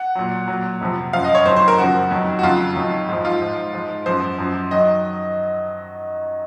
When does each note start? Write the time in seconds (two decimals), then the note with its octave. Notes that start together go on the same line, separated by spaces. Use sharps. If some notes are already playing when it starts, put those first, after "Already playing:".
Already playing: F#5
0.15 A#2 F#3
0.48 A#2 F#3
0.81 F2 C3 F3
1.13 F#2 F3 F5
1.24 D#5
1.35 C#5
1.46 F2 D#3 F#3 C5
1.56 C5
1.68 A#4
1.78 F#2 C#3 F3 F#4
2.10 F2 D#3 F#3
2.39 F#4
2.43 F2 C#3 F#3 F4
2.76 F2 D#3 F#3
3.08 G#2 F3
3.25 F4
3.41 G#2 F3
3.73 G#2 F3
4.06 F#2 F3 C5
4.38 F#2 F3
4.71 D#3 F#3 D#5